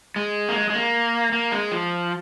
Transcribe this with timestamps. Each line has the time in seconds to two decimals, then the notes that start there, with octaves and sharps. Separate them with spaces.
0.16 G#3
0.49 A#3
0.56 G#3
0.70 G#3
0.75 A#3
1.32 A#3
1.52 G#3
1.71 F3